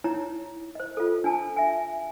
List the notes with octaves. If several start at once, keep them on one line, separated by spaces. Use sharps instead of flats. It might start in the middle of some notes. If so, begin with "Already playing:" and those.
D#4 E4 C#5 A#5
C5 D#5
F4 A4
D4 G#5 A5
E5 G#5